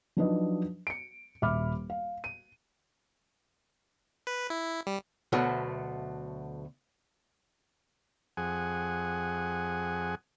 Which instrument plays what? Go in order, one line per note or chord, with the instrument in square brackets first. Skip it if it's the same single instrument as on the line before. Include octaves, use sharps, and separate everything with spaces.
[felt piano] F3 F#3 D4 D#4 B4 D#5
C#7 D7
D#1 E5 B5 D6 F6
F5
D#7
[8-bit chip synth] B4
E4
G3
[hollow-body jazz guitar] D2 B2 F#3 A3
[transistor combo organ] F2 G#4 F#5 G#5